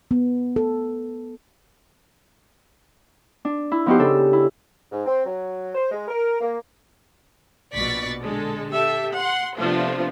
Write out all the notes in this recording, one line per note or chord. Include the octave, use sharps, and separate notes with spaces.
B3
A4
D4
E4
F3 B3 D#4 F#4 G4 C5
C#3 D4 A4
E4
G#2
C4
F#3
C5
G#3
A#4
A#3
A#1 B2 D5 C#6 A6 B6
D3 G#3 A4
G4 A4 E5
F#5 C6
C3 F3 A3 B3 D4 F4